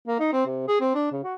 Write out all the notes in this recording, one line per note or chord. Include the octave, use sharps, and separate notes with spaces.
A#3
D#4
C4
C3
G#4
C4
D4
C#3
F#4